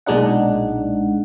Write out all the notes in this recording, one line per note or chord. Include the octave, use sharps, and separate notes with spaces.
B1 A#2 G#3 D4 D#4 F#5